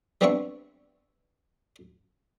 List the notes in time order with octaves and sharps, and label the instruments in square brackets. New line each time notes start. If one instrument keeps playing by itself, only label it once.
[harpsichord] G3 B3 C4 D4 E5 C#6